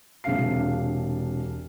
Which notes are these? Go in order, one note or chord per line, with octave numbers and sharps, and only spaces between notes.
E1 C3 D4 G#4 F5 C7